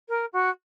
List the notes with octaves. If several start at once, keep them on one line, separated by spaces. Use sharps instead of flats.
A#4
F#4